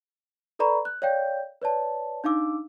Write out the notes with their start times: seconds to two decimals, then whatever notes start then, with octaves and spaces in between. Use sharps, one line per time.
0.59 A4 B4 D5 A#5 B5 C#6
0.85 F#6
1.02 C#5 D5 F5 G5 G6
1.62 B4 C#5 D5 A5
2.24 D4 D#4 F5 D6 E6